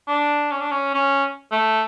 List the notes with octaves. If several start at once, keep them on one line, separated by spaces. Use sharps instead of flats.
D4
C#4
D4
C#4
C#4
A3